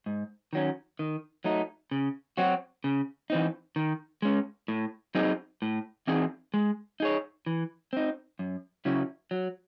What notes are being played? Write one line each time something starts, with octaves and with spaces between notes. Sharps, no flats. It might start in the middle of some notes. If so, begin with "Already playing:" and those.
G#2
D#3 F#3 C#4
D#3
F#3 A3 D#4
C#3
F#3 C4 F#4
C#3
E3 C4 D#4
D#3
G#3 C#4
A2
F#3 C4 D#4 G#4
A2
E3 C4 D#4 G#4
G#3
D#4 G#4 C#5
E3
C4 D#4
F#2
C#3 F#3 C#4 E4
F#3